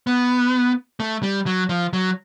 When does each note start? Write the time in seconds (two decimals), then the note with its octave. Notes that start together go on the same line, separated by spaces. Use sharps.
0.07 B3
1.00 A3
1.23 G3
1.46 F#3
1.69 F3
1.93 F#3